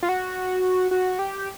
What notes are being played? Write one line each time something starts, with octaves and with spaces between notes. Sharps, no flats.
F4
F#4
F#4
G4